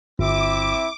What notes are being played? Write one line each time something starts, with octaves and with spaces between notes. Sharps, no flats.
G1 C4 E4 E5 D6